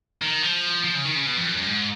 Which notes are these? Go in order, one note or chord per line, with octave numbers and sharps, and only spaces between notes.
D#3
F3
F3
C#3
D#3
C#3
B2
F2
F#2
F#2
G#2